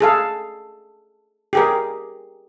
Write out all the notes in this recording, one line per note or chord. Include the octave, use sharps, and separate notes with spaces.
G#4 A4 F5
G4 G#4 A#4